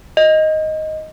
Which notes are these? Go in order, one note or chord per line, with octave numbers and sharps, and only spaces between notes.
D#5